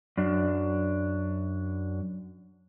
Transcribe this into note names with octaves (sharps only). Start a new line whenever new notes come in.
F#2 D4